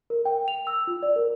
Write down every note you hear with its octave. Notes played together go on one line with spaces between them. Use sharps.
A#4
G5
F7
E6
F4
D5
A#4